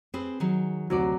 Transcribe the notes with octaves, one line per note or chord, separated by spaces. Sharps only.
C4 G#4 B4
D#3 F#3 G#4
D2 C3 F#3 D5